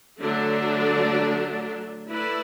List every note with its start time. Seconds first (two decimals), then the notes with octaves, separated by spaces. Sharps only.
0.20 D3 F#3 A3 D4
2.07 A3 E4 B4 D5